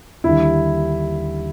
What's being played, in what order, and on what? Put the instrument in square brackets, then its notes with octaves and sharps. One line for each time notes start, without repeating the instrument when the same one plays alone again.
[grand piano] D#2 D3 G3 E4